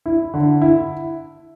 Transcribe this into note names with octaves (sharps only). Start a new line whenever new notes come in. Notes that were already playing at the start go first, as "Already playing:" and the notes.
E4
D3
E4